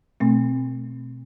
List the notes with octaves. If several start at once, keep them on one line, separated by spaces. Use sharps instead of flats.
B2 A3 C4